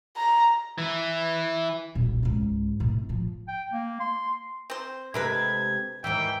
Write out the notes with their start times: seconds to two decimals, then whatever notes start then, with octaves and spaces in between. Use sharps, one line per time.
0.17 A#5
0.78 E3
1.95 D#1 B1
2.23 C#2 G#2
2.80 A2 C3
3.09 A2 F3
3.48 G5
3.72 A#3
4.00 C6
4.70 C4 C5
5.14 C3 G#3 A3 D4 A#4 B4 G#6
6.04 D#2 G#2 E3 G5